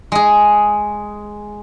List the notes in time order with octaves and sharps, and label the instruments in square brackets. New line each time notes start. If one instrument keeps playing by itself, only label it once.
[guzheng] G#3 G#4